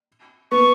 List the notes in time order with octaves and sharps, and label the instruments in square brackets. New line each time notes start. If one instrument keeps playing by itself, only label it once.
[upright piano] B3 [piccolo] C#6